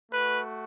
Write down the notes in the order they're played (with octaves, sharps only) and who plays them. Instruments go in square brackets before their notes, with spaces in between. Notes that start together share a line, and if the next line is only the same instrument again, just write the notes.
[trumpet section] A3 F#4 B4